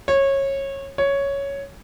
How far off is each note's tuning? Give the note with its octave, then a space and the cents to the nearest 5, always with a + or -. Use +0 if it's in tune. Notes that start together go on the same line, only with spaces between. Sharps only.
C#5 -20
C#5 +5